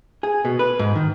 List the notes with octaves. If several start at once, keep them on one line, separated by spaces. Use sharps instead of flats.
G#4
B2
B4
G#2
D#3